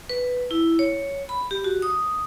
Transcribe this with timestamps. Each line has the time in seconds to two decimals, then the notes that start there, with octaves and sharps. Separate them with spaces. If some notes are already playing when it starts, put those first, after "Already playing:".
0.09 B4
0.51 E4
0.79 C#5
1.29 B5
1.51 G4
1.64 F#4
1.82 D#6